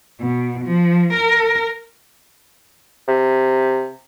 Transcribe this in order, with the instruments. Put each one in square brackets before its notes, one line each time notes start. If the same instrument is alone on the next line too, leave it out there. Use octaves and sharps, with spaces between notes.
[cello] B2
F3
A#4
[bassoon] C3